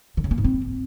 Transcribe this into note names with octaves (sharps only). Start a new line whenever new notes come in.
D3
C#3
A#3
G#2
C4